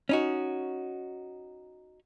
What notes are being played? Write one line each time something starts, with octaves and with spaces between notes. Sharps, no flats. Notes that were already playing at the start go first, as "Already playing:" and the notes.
C#4 D#4 F#4